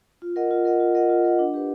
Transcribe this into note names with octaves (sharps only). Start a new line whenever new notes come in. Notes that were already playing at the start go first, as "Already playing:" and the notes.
F4
A#4 D#5 F#5
F4
A#4 D#5 F#5
F4
A#4 D#5 F#5
F4
A#4 D#5 F#5
D4
G4 B4